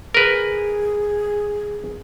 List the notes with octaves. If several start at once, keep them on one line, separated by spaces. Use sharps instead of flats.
G#4 A#4 B4